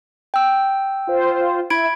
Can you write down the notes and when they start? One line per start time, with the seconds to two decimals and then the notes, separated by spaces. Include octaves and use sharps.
0.34 G5 E6
1.07 F4 C5
1.70 E4 B5 G#6 D7